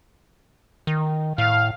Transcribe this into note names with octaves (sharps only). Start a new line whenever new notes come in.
D#3
A2 F5